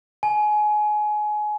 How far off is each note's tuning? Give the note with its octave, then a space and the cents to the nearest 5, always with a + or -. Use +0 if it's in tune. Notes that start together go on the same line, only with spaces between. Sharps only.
G#5 +25